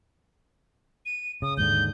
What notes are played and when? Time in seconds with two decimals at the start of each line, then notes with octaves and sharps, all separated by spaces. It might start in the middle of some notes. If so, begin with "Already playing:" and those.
1.06 D#7
1.42 C#3 D#6
1.57 D#2 G#2 D3 G6